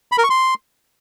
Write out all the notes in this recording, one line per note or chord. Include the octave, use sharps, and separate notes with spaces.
B5
A#4
C#6
C6